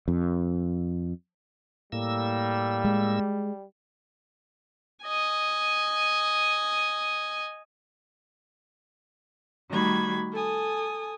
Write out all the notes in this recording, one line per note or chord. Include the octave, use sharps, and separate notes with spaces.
F2
A2 G3 A#3 E6
G#3
D#5 G#5
D#3 G3 A3 F#4 B5 G#6
A4 G#5 D#6